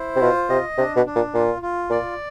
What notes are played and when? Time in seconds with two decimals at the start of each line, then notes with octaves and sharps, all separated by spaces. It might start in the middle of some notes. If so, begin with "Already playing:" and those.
Already playing: E4 C5
0.16 C3
0.21 B2 F4
0.49 C3 D#5
0.78 C3 D4
0.96 B2
1.06 D4
1.15 A#2
1.34 A#2 F4
1.62 F4
1.90 A#2 D5